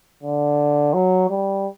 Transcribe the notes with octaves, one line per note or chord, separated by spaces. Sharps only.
D3
F#3
G3